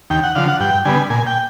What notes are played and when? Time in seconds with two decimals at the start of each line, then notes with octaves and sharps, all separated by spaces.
0.10 D#2 G5
0.24 F#5
0.35 D3 F3 F5
0.48 F#5
0.60 G2 G5
0.85 D3 G3 B3 G#5
1.10 A#2 G#5
1.27 G5